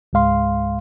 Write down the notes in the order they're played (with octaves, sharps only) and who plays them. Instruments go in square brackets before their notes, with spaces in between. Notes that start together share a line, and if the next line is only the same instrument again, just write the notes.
[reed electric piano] C#2 G#2 G#3 F5 C6